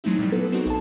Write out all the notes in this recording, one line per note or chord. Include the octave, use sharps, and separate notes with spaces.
F#3 G#3 A3 C4 D#4 E4
A#2 G3
B3 A4 B4
C4 D4 D#4 F#4 G#4
A#1 A5